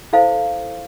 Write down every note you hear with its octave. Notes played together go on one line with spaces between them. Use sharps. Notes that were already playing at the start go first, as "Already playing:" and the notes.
E4 A4 C5 F5